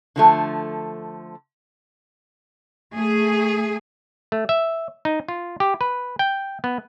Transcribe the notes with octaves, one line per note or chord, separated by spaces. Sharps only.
D3 F3 A3
A3 G#4
A3
E5
D#4
F4
G4
B4
G5
B3